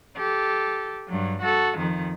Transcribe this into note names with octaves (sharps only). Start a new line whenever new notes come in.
G4 A4
G2 F#3
F#4 A4
F2 D#3